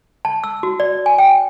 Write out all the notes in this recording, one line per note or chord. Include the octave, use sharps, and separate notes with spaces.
A5
E6
F#4
D5
G#5
G5